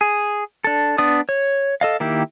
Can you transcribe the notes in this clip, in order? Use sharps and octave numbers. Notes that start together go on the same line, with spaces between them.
G#4
D4 A4
B3 D4 D5 D#6
C#5
A4 D#5 F5
D#3 A#3 E4 G4